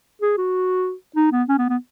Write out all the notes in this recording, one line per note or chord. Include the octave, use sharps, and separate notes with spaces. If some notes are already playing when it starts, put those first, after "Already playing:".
G#4
F#4
D#4
B3
C#4
B3
B3